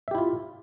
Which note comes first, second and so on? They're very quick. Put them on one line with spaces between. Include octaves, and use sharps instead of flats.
E5 G4 E4 F4